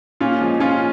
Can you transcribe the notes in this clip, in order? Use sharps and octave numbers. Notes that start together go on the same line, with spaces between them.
A#2 C#4 F4
F3 G#3
A#2 C#4 F4